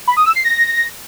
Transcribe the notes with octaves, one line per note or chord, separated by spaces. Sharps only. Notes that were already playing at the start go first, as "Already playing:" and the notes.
B5
D#6
E6
C7
A#6